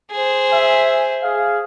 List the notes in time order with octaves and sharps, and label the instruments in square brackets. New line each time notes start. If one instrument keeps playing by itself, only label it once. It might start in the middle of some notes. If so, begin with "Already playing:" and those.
[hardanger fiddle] G#4 C5
[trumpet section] E5 G#5
G#4 F5